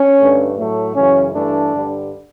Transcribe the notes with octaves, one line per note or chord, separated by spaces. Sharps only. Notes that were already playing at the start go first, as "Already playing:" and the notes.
Already playing: C#4
G2 D3 A3
A2 F#3 A3
F#2 C#3 E3 C#4
G2 E3 A3 D4
G2 D3 G3